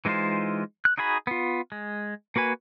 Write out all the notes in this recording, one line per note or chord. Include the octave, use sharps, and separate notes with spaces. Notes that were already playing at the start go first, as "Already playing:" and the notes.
E3 G#3 D#4 F4 C5
F#6
D#4 F#4 G#4 B5
B3 F4
G#3
A#3 F#4 B4 G#5